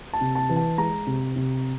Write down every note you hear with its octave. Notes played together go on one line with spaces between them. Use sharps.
A5
C3
A5
E3
A5
G#3 A#5
C3
C3